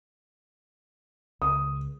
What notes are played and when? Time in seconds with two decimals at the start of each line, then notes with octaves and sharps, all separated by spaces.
1.42 C#2 D#6